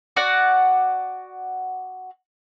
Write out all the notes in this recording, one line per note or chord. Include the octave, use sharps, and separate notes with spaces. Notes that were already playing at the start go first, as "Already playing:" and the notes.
F#4 D5 F#5